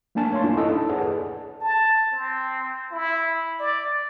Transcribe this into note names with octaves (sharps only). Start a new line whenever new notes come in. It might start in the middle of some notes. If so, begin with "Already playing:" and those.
A3 A#3 D4 G#5 A5
C#5 F5 C6
A#3 C#4 D4 E4 F4
D#4 E4 A4 D#5
A5
G#4 A4 B4 C#5 D5 F#5
A5
C4
E4
D5